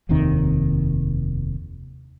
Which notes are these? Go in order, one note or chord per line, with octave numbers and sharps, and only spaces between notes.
F1 D#2 C3 D#3